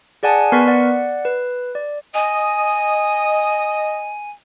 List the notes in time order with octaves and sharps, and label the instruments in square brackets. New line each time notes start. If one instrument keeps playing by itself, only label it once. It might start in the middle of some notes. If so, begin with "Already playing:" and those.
[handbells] G#4 D5 F#5 G#5 A5
B3 A#4 B4 D5 C#6 B6
D5 F#5
B4
D5
[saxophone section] D#5 [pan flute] G#5